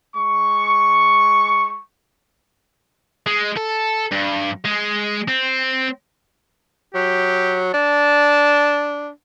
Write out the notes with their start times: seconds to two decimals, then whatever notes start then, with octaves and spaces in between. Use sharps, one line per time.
0.15 G#3 C#6
3.27 G#3
3.57 A4
4.12 G2
4.65 G#3
5.28 C4
6.95 F#3 G4
7.74 D4 A5